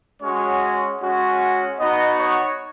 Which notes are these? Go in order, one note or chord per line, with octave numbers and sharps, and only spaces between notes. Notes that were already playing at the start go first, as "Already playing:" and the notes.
G#3 C#4 F#4 C#5
G#3 C#4 F#4
B3 D#4 F#4 D#5
C#5